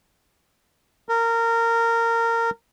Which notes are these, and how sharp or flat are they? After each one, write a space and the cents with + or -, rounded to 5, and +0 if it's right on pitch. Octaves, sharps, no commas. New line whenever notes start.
A#4 -20